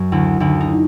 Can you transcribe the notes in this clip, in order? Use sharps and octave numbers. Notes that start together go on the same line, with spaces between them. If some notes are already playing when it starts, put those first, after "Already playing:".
Already playing: F#2
D2 E4
D2 E4
D#4